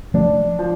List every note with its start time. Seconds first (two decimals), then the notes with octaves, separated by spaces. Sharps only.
0.14 F3 A3 D4
0.59 F3